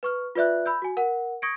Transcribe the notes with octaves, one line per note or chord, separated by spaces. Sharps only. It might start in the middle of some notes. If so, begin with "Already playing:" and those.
B4 C#6 F6
F4 B4 D5 E5 F#6
B5 E6 G6
F#4 G#5
A#4 F#5
C#6 D#6 G#6 A#6 C#7 D7